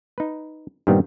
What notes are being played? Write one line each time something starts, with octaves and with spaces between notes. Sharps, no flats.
D#4 B4
G2 A#2 D#3 G3 B3 C4